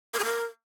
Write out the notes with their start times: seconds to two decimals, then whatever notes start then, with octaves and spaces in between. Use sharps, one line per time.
0.14 A#4
0.19 G#4
0.25 A#4